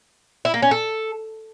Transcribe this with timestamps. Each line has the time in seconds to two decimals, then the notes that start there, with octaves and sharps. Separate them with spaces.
0.45 E4
0.54 A#3
0.62 C#4
0.71 A4